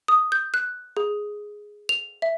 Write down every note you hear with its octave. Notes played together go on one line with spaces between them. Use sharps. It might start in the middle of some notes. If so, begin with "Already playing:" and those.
D#6
G6
F#6
G#4
F7
E5